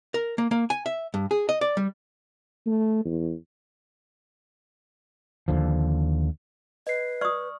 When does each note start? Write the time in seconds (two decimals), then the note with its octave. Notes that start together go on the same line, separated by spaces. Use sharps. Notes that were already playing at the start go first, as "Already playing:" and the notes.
0.14 A#4
0.38 A#3
0.51 A#3
0.70 G#5
0.86 E5
1.14 G2
1.31 G#4
1.49 D#5
1.61 D5
1.77 G3
2.66 A3
3.05 E2
5.48 D#2 D3 F3
6.87 B4 D#5 C7
7.21 D5 C#6 D#6 F6